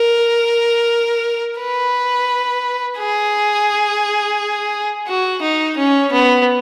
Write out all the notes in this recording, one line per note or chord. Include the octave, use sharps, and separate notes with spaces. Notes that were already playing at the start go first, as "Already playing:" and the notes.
Already playing: A#4
B4
G#4
F#4
D#4
C#4
B3